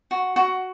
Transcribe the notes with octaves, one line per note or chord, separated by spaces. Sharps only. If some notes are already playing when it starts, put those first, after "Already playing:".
F#4
F#4